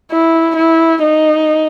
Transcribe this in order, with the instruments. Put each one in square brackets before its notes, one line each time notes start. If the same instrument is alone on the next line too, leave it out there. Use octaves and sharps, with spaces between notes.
[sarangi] E4
E4
D#4